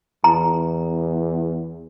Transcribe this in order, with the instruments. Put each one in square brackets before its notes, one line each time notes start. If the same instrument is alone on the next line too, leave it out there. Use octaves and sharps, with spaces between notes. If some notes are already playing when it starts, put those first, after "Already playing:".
[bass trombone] E2 [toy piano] A#5